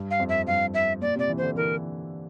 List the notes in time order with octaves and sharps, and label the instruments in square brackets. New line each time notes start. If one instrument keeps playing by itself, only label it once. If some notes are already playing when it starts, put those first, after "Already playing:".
Already playing: [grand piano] G2
[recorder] F5
[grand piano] F2
[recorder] E5
[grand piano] G2 [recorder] F5
[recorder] E5
[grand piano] A#2 [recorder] D5
[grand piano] C3 [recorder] D5
[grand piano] E3
[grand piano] D3 [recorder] C5
[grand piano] E3 [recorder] A#4